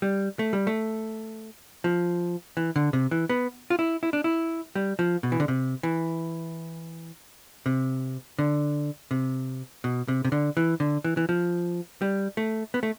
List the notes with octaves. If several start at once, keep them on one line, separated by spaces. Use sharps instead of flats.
G3
A3
G3
A3
F3
E3
D3
C3
E3
B3
F4
E4
E4
D4
E4
G3
F3
B2
E3
D3
C3
E3
C3
D3
C3
B2
C3
C3
D3
E3
D3
E3
E3
F3
G3
A3
B3
A3